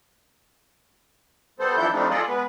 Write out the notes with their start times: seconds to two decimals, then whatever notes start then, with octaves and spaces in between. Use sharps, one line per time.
1.59 G3 B3 A4 C5
1.77 E3 F3 D4 E4 A4 G6
1.92 F3 G3 A3 C4 D4 D#4
2.10 F4 G#4 A4 D5 D#5
2.28 G#3 B3 B4